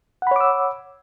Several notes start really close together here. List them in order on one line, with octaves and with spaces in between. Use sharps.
F#5 B5 C#5 D6 E6